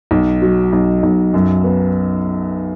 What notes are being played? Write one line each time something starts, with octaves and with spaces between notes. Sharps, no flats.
B1
F#3
B1
B1
F#2
B3